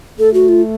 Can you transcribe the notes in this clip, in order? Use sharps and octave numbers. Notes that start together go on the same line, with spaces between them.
A3 A4
F#4
F4